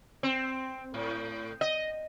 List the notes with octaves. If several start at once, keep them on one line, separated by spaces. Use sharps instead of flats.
C4
A2
D#5